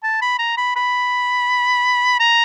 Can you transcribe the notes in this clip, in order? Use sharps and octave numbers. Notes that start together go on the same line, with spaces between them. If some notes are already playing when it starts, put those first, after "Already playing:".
A5
B5
A#5
B5
B5
A#5